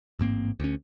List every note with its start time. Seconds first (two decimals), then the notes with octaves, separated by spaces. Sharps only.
0.19 A1 G#2 A#3 C4
0.60 D2 C#4